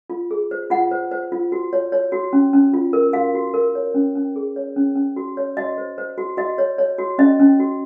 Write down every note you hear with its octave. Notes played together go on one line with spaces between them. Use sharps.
F4
G#4
C5
F4 F#5
C5
C5
F4
F#4
C#5
C#5
F#4
C#4
C#4
F4
A#4
F#4 F5
F#4
A#4
C#5
C#4
C#4
G#4
C#5
C#4
C#4
F#4
C#5
F#4 D#5
C5
C5
F#4
F#4 D#5
C#5
C#5
F#4
C#4 D#5
C#4
F#4